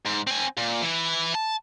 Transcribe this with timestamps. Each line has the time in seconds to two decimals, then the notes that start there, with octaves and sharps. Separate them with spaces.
0.06 G#2
0.27 C4 G#5
0.57 A#2
0.81 E3 E4
1.35 A5